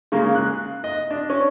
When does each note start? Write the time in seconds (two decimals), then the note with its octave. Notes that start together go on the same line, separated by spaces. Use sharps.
0.12 C#3 G#3 A#3
0.35 F#6
0.84 D#5
1.11 D4
1.30 C#4